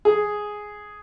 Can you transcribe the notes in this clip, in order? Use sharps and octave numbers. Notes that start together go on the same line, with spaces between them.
G#4